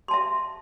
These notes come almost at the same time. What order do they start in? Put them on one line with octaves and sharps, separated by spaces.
C6 A5 E5